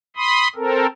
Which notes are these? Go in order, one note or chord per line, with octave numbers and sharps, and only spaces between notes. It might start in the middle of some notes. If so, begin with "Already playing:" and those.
B5 C6 D#6
C4 A4 A#4